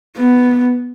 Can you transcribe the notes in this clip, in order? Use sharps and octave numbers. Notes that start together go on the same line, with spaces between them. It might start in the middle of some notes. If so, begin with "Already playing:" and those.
B3